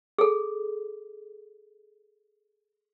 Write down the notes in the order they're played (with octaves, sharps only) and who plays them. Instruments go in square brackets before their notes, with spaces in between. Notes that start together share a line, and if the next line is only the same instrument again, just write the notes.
[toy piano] G#4 A4